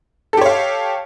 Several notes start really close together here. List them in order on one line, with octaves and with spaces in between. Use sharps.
A4 G4 C#5 F5